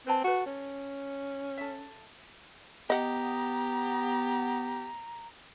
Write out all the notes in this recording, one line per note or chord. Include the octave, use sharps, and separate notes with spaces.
C4 B4 G#5 A5
F#4 A4 B4
C#4
A4 E5
B3 G4 D#5 F#5 A#5